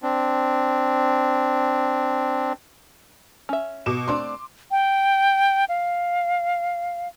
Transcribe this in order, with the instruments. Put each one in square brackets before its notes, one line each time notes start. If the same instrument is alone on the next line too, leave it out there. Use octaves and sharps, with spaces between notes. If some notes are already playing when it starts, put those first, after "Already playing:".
[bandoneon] C4 D4
[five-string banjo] C#4 E5
[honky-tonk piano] B2 D6 E7
[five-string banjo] A3 C4 D4 [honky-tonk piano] C6 D6
[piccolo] G5
F5